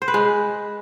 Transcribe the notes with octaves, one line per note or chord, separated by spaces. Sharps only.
C5
B4
G#3